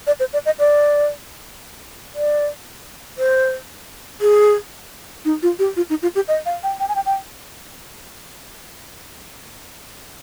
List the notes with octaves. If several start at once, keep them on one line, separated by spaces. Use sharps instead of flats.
D5
C5
D5
D#5
D5
D5
C5
G#4
D#4
F4
G4
F4
D#4
F4
G4
D#5
F5
G5
G5
G#5
G5
G5